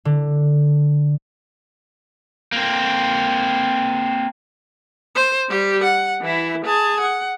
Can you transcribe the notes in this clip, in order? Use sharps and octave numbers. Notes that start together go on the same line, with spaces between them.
D3
A#3 C4
C5
G3 G4
F#5
E3 E4
G#4 A5
F#5